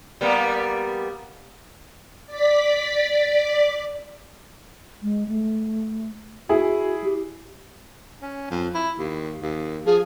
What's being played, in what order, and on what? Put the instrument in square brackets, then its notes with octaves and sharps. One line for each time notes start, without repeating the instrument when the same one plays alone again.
[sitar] G3 A#3 B3
[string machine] D5 B6
[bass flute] G#3
A3
[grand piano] E4 G#4 [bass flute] F#4
[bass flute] G4
[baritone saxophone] C#4
F2
E4
D#2
D#2
[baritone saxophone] F3 [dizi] G#4